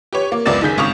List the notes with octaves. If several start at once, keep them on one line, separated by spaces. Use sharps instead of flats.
G4 B4 C#5
A#3
F#1 C#2 B3 D5 A6 E7
F#1 D#3 G#4 G6 B6
G#1 C#3 C#6 D#6 F7